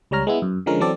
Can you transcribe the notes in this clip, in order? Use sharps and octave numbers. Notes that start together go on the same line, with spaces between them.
C#2 G3 C#5 A#5 F6
G#3 B3 E4
F#2
D3 F3 G#3 C#4 A#4
E3 F#3 C4 A4 D5